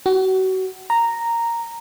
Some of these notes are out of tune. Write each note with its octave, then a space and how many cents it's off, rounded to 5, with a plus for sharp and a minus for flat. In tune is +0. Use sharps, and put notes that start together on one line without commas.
F#4 +30
A#5 -5